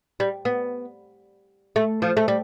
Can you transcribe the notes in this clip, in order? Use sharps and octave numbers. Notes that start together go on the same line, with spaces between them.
G3
B3
A3
F3
A3
G3